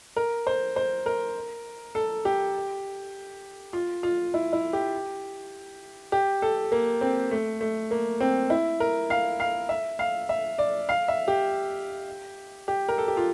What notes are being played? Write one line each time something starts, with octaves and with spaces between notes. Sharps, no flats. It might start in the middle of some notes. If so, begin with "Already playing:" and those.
A#4
C5
C5
A#4
A4
G4
F4
F4
E4
E4
G4
G4
A4
A#3
C4
A3
A3
A#3
C4
E4
A#4
F5
F5
E5
F5
E5
D5
F5
E5
G4
G4
A#4
A4
G4
F4